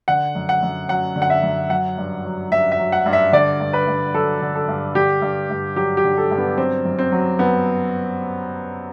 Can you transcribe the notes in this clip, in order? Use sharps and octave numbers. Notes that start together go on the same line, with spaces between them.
D3 F#5
F#2
F#5
F#2
F#3 F#5
D3
F#5
E5
F#2
F#3 F#5
G2
F#3
G2 E5
E5
F#3
F#5
G2
E5
D3 D5
G2
B4
G2
F#3 A4
D3
A4
G2
D3 G4
G2
G2
F#3 G4
G4
D3
A4
G2
B3
F#3 C4
F#2
C4
F#3
F#2 B3